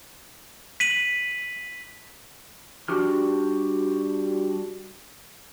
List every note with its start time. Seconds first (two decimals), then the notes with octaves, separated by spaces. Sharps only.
0.80 B6 D#7 F#7
2.88 G3 D4 F#4 G4 F6